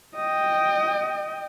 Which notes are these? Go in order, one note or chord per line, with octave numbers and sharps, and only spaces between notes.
D#5 G5